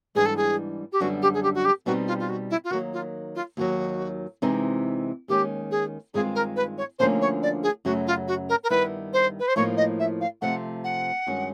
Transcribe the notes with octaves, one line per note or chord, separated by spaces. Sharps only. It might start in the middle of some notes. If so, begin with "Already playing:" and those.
G#2 E3 G3 B3 D4 G#4
A4
G#4
G4
F#2 D3 G3 B3 D4 F#4
G4
G#4
G4
F#4
G4
B2 G3 C4 D#4 F#4
F4
F4
F#4
E4
F4
D#3 F#3 A#3 F#4
F4
F4
D#2 D#3 F#3 F#4
C3 E3 G#3 C4 D#4
D#2 D#3 G#3 C#4 G4
G#4
G2 D#3 G#3 C4 F4 G#4
A#4
B4
C#5
D2 D3 F3 A#3 C#4 C5
C#5
D5
G#4
F#2 C#3 F#3 A3 F#4
F4
F#4
A#4
A#4
G2 D#3 G3 B3 E4 B4
C5
B4
C5
A2 F3 A#3 D#4 C#5
D#5
E5
F5
C3 F3 A3 C4 F#5
F#5
G2 D#3 G#3 C#4 F#4